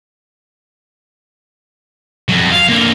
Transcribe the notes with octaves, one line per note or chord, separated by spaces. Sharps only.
F2 F#3
F5
D3 A#3